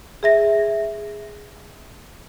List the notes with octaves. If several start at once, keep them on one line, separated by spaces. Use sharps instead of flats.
G#4 E5 A#6